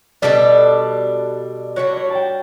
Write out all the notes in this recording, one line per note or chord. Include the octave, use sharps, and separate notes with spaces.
B2 G3 D4 A4 D5
G3 D4 F#4 C#5
C#5
G5 A5